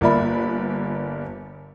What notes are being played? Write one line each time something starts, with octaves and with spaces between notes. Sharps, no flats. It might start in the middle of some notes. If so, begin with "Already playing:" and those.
G1 A#3 F4 D5 E5 B5